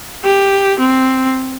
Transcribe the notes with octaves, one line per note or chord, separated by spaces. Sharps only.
G4
C4